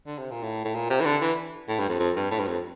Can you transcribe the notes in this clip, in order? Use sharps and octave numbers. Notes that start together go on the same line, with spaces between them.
D3
C3
A#2
A2
A2
A#2
C3
E3
D3
E3
A2
G2
F2
F2
G2
A2
G2
F2